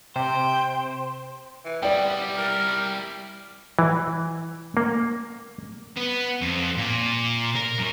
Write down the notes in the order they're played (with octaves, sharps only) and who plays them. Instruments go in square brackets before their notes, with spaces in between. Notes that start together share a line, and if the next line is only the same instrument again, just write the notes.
[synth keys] C3 [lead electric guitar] C5 [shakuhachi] G5
[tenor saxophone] E3
[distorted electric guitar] G3 E4 [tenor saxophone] B3 [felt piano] D5 G5
[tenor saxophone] A#4
[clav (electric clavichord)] E3
A#3
[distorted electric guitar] B3
F2
A#2
A#4
F#2